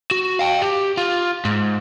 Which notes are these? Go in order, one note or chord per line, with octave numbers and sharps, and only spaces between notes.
F#4
F5 G5
G4
F4
G#2